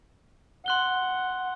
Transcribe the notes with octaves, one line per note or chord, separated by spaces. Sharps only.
F#5 C6 F#6 G7